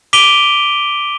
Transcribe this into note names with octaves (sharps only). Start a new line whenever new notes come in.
D6 B6 D7 D#7 F7 G7